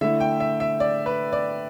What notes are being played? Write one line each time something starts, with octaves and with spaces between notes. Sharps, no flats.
D3 A3 E4 E5
G5
E5
E5
D5
B4
D5